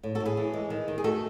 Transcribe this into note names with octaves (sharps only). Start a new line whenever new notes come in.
A2
F#4 A4
A2
G#4 B4
E3
G#3
D#3
D#3
G#4
A3 F#4 A4